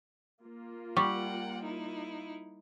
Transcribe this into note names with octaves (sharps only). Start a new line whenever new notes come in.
A#3 F4
G3 F#5 G5 C#6
D#4 E4